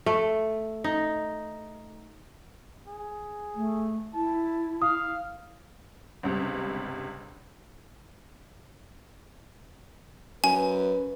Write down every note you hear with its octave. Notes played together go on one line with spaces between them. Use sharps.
A3
D#4
G#4
A3
E4 A5
F5 D#6
G1 C#2 C3
F#2 B4 G#5